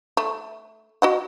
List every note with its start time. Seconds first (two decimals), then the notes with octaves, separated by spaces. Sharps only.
0.17 A3
1.02 F#4 D#5 F#5